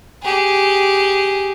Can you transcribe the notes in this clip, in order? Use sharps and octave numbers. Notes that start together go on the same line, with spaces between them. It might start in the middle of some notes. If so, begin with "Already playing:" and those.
G4 G#4